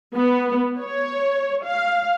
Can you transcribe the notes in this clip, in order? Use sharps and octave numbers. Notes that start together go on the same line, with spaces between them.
B3
C#5
F5